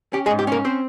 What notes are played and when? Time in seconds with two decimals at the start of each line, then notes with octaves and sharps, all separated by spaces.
0.13 C#4 G4
0.26 G#3 G#4
0.31 G#2
0.39 G4
0.47 A#3 C#4 A#4
0.65 C4 C5